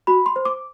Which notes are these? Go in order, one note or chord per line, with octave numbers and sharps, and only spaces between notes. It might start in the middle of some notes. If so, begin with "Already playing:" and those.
F#4 B5
C6
C5
D6